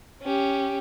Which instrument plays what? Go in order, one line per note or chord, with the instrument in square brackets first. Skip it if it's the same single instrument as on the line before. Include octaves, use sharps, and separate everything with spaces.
[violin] C#4 G4